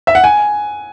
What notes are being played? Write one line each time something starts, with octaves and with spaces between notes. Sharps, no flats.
E5
F#5
G#5